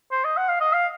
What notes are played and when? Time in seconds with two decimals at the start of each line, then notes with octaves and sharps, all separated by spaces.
0.12 C5
0.25 D#5
0.37 F#5
0.49 F5
0.61 D#5
0.73 F5